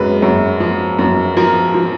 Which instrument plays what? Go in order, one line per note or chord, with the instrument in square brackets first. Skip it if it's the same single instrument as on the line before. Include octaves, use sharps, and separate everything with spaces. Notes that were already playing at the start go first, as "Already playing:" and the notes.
Already playing: [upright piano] F#2 G#3 B4
F#2
F3
F#2
F3 A#4
F3